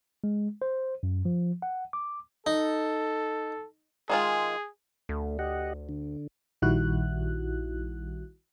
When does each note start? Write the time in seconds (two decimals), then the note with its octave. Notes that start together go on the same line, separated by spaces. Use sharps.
0.24 G#3
0.62 C5
1.03 F#2
1.25 F3
1.62 F#5
1.93 D6
2.47 D#4 A4
4.10 D#3 G#3 F4 G#4
5.09 D2 A3
5.39 G4 D#5 F#5
5.89 D3
6.62 A#1 D#3 G3 E4 F#4 F#6